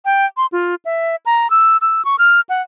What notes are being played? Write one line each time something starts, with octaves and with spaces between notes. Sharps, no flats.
G5
C6
F4
E5
A#5
E6
E6
C#6
F6
F#5